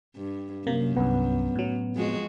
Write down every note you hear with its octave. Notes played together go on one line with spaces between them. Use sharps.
G2
F#2 C3 A#3
C2 G2 B3
A2 F#3
F2 G#3 F#4